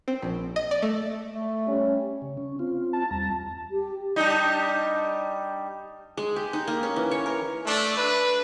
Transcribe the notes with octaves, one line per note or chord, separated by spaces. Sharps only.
C4
A#1
D#5
D5
A3
A3
G3 C#4
C#3
C#4
C4 F4
A5
E2 G3 A#5
G4
G3 D4 D#4
G#3
G4
D#4
A#3
C#4
E3
C#5
A#4
A3 D4
D4 B4